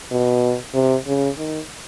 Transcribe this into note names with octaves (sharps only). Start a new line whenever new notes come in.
B2
C3
C#3
D#3